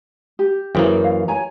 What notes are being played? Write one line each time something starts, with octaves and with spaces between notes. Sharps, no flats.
G4
F#2 E3 A#3 G#4 C5 G5
C5 F5
C#5 G#5 A#5